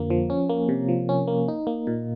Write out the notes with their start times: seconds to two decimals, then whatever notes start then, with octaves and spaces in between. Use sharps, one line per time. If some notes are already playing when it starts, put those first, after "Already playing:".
Already playing: F2 D3 F3 A#3
0.10 F3
0.30 C#4
0.49 A#3
0.69 C3
0.89 F3
1.09 C#4
1.28 A#3
1.48 D#4
1.67 A#3
1.87 A#2